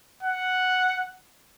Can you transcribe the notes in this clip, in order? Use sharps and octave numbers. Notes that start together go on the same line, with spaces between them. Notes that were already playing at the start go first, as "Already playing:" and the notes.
F#5